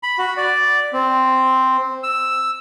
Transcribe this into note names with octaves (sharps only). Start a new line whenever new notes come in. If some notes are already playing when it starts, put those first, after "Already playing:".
B5
F#4
D5
C4
E6